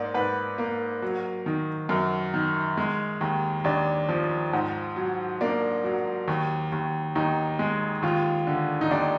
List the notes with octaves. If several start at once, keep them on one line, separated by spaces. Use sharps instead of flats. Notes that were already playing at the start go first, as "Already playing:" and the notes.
Already playing: G#2 A#3 D5
G#2 B4
A#3
F#3
D#3
F#2 A#4
D#3
G#3
D#2
D#2 D4
F3
G#2
F#3
A#3 D4
F#3
D#2
D#2
D#2 D#4
G#3
D#2 F4
D3
D#4
D#2 D4